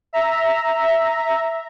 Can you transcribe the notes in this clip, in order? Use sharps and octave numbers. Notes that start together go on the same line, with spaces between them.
E5 A#5